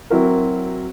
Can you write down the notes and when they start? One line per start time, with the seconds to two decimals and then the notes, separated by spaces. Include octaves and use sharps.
0.10 F#3 C4 E4 F#4 A#4